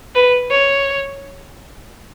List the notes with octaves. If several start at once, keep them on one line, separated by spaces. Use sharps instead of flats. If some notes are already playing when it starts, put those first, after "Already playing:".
B4
C#5